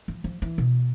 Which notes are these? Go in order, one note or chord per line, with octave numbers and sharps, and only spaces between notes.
F3
F3
E3
B2